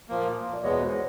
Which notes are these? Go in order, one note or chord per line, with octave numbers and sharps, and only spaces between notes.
A#2 F3 A#3
D5
E2 B2 G#3 B3 C#5
C5